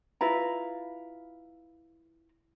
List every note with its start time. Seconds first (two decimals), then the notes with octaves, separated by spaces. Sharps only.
0.21 E4 F4 B4 A#5